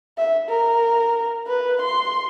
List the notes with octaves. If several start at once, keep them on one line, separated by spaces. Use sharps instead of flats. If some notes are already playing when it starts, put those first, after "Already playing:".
E5
A#4
B4
C6